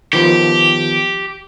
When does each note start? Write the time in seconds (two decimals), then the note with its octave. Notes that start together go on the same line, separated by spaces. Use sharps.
0.13 D#3 F3 B3 G4